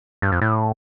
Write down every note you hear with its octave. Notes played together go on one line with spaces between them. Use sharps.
G2
F2
A2